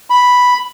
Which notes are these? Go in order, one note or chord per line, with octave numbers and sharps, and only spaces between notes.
B5